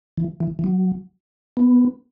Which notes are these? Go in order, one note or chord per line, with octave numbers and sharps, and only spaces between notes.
E3
E3
E3
F#3
B3